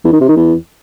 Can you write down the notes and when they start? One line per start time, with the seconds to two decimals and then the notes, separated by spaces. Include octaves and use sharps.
0.05 E2
0.12 D#3
0.20 C3
0.28 D#3
0.36 E2